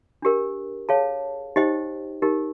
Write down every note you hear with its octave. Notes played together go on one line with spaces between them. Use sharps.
D4 G4 A#4
G#4 C#5 F5 A5
D#4 G4 C5 D#5 G5
D#4 G4 A#4